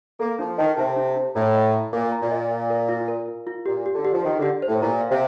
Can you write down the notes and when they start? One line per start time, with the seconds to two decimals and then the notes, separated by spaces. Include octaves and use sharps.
0.20 A#3 A4
0.39 F3 D4
0.58 D#3 A5
0.77 C3 A5
0.96 D4
1.16 D4
1.35 A2 A#5
1.54 D#5
1.74 A#5
1.93 A#2 D6
2.12 A#5
2.22 A#2
2.31 D#5
2.51 F5
2.70 A#4
2.89 F4
3.08 A#4
3.28 F4
3.47 F4
3.66 A#2 G4
3.86 G4
3.94 D3
4.05 G4
4.13 F3
4.24 D#3 G4
4.39 D3 G4
4.62 C5
4.68 A2
4.82 A#2 A#5
5.01 F5
5.10 C3